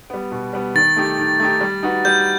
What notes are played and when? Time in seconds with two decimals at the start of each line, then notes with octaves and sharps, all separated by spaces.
0.10 G3 B3
0.32 B2
0.53 G3 B3
0.75 D#3 A6
0.96 A3 D#4 G4
1.19 D#3
1.40 A3 D#4 G4
1.61 G3
1.83 D#4 F#4 B4
2.05 G3 G6